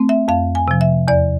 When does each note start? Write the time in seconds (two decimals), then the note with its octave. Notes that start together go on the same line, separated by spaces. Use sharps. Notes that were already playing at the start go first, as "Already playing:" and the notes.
Already playing: A3 C4
0.09 E5
0.28 F2 F5
0.55 G#5
0.68 C3 F3
0.81 E5
1.08 E2 D5